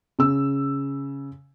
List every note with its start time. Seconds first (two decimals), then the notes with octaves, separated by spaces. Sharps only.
0.19 C#3 E6